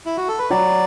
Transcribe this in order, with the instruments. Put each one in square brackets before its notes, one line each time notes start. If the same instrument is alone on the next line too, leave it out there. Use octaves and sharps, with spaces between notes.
[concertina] E4
F#4
A4
B4
[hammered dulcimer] F#3 [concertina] D5